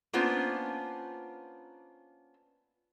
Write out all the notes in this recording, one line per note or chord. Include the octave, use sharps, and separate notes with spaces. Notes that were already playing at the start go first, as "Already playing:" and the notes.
A#3 B3 C#4 D4 F4 C5